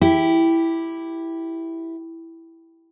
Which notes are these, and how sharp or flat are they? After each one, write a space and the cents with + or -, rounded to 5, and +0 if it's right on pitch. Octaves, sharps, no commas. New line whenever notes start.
E4 +0 G4 +0